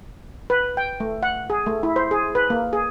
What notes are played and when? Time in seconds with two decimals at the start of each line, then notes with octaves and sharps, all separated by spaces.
0.50 B4
0.77 G5
1.00 A3
1.23 F#5
1.50 G#4
1.66 A3
1.83 E4
1.96 C5
2.11 G#4
2.35 B4
2.50 A#3
2.73 G#4